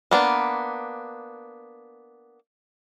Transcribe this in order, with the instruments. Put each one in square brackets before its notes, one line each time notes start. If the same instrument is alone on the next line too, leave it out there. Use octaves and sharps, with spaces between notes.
[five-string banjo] A#3 B3 D4